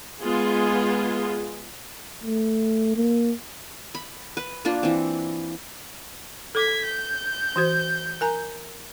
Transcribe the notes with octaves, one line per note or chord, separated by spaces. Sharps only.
G#3 B3 F4 G#4
A3
A#3
B5
B4
A#3 D4 F4
E3 C4
A4 D6 G#6 B6
G6
E3 F#4 C5
A#4 G#5 A#5